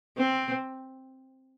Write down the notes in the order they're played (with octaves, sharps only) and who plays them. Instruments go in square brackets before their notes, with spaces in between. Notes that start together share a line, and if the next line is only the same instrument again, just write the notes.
[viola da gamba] C4